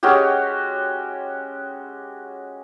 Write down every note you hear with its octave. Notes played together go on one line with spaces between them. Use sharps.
G#3 C#4 F#4 G4